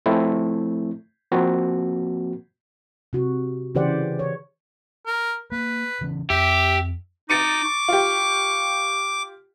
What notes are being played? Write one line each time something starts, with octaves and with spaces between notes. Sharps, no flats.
F3 A3 C4 E4
F3 A#3 C4 F#4
C3 F#4
C#3 E3 G4 C5 D5 F#5
C#5
A#4
A#3 B4
C#3 E3 C#4
F2 G4 E5
D#4 D6 A6 C#7 D#7
C#6
F4 G4